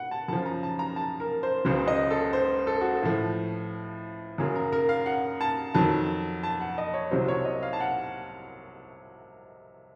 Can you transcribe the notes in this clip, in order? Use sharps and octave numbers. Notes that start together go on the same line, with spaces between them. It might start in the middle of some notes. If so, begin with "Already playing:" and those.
Already playing: F#5
A5
F#2 C#3 F3 A5
A#5
A5
A#5
A5
A#4
C5
C#2 C#3 F#3 C5
D#5
A4
C5
A4
F#4
A4
A2 F3
F#2 C#3 F#3 A#4
A#4
A#4
F5
F#5
A5
F2 D#3 F#3 A5
A5
F#5
D#5
C#5
C2 C3 F#3 C5
C#5
D#5
F5
A5
F#5